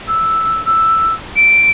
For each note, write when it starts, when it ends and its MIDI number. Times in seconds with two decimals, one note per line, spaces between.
0.08 0.61 88
0.66 1.14 88
1.36 1.70 98